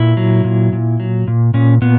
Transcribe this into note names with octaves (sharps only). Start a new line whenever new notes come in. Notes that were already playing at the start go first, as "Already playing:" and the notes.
Already playing: A#2 E4
F#3
A#2
A#2
F#3
A#2
A#2 C#4
A#2 B3